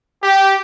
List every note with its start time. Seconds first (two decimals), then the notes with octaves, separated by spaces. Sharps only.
0.22 G4